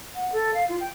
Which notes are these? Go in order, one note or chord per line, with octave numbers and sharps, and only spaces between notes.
F#5
A4
F5
F4
G5